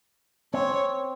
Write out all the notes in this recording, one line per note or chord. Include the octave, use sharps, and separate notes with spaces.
C4 C#5